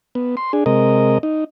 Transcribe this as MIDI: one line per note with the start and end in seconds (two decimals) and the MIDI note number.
0.15 0.35 59
0.37 0.52 84
0.53 0.64 62
0.53 0.64 68
0.66 1.18 48
0.66 1.18 56
0.66 1.18 70
0.66 1.18 75
1.23 1.44 63